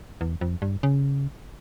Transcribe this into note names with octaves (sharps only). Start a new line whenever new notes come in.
E2
F2
G2
C#3